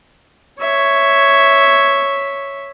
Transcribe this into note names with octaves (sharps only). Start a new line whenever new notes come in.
C#5 E5